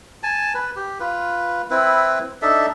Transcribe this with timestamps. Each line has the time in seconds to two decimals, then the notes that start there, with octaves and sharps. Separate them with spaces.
0.23 G#5 A5
0.54 B4
0.76 G4
1.00 F4 B4
1.70 C4 E4 B4
2.42 D4 D#4 A4 E5